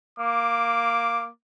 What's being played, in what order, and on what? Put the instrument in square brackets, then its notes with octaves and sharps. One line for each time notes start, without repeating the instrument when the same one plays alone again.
[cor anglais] A#3 [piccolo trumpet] D6